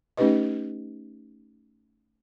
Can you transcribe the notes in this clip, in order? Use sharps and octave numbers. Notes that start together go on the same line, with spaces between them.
A3 C#4 D#4 G4 B4 D#5